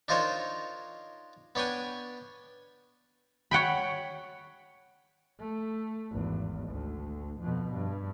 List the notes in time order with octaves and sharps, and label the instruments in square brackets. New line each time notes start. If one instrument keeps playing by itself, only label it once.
[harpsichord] D4 D#4 F4 A#4 C5 C#5
B3 D4 C#5 G5 G#5
[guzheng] C#5 F#5 G5 B5
[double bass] A3
G#1 E2
D2
F2 B2
G2